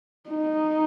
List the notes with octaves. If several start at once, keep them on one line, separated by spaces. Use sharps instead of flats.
D#4